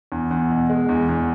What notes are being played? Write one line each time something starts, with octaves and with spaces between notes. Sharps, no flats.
E2
E2
B2
G#3
E2
E2